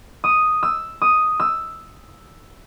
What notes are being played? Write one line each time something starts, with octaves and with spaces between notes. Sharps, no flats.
D#6
E6
D#6
E6